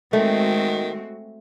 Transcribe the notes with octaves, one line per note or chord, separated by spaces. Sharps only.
D#3 G#3 A3 C4 F#4